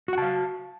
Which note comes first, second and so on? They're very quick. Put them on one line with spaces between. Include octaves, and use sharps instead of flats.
F#4 F#5 A5 F5